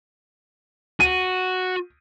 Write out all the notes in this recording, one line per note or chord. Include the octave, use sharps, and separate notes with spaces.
F#4 D#7